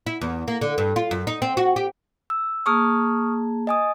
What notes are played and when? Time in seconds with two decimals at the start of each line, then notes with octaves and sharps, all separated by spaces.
0.07 E4
0.21 E2
0.48 A#3
0.61 D3
0.78 G2
0.96 F4
1.11 F#2
1.27 D#4
1.42 C4
1.57 F#4
1.76 G4
2.30 E6
2.66 A#3 G#4 A5 C#6 D#6 F6
3.67 D#5 G#5 D#6